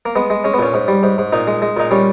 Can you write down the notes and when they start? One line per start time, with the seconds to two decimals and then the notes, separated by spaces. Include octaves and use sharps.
0.06 A#3
0.15 G#3 B3
0.30 G#3
0.44 G#3 C#4
0.54 B3
0.59 A#2 C#4
0.74 G#2
0.88 G3
1.03 G#2
1.18 G#2
1.33 A#2 D#4
1.47 G#3
1.62 G#3
1.77 A#2 D#4
1.91 G3 C#4